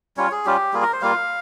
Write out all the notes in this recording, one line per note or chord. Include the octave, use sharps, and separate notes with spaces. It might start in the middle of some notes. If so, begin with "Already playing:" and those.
G3 C#4 F4 C#5
G#4
G3 C#4 F4 G4
G3 A#3 F4 G#4
A#4
C5
G3 A#3 F4 F5